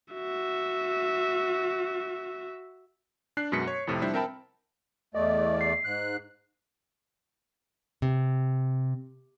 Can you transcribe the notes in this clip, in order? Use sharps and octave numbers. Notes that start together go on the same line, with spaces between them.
F#4 E5
D4 F#6 C7
F#2 B2 G#3 B6 C#7
C#5
F2 A2 C3 F3
F3 G3 D4 E4 C5 E5
C4 A#4 E5 G5 A5 B5
E2 A3 D5 D#5
C7
G#2 F#6
C3